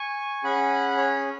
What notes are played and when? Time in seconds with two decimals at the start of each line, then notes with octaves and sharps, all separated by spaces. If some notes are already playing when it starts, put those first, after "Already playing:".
Already playing: G#5 C#6
0.44 C#4 G#4 F#5 B5
0.97 C#5